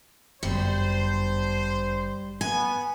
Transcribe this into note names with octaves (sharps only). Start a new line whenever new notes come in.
G1 F#2 G3 D4 C5
B3 G#5